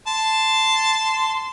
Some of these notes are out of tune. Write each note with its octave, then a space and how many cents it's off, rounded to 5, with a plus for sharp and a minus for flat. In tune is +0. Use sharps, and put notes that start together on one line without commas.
A5 +0 C6 -10